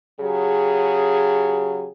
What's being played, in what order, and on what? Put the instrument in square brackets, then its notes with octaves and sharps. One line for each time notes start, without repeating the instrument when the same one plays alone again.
[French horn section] C#3 F#3 G4 G#4